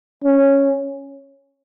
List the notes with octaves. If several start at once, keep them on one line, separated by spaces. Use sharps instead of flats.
C#4